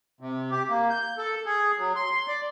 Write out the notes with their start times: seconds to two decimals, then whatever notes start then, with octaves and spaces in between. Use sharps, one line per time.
0.21 C3
0.51 G4
0.70 A#3
0.90 G6
1.18 A4
1.46 G#4
1.78 F#3
1.96 C6
2.11 C6
2.28 D5